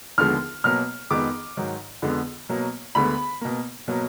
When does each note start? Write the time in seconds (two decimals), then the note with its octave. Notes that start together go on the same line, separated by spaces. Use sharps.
0.18 D#2 D3 F3 G#3 B3 F6
0.64 B2 F#3 A#3 F6
1.10 F2 D#3 G#3 B3 D6
1.57 G#2 D#3 F#3
2.02 F2 D3 G#3 B3
2.49 B2 F#3 A#3
2.95 D2 D3 G#3 B3 B5
3.41 B2 A#3
3.88 B2 F#3 A#3